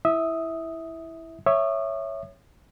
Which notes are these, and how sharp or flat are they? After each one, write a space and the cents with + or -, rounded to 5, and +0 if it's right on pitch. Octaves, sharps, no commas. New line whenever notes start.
E4 +0 E5 -20 D#6 +0
C#5 +0 E5 +0 D#6 -45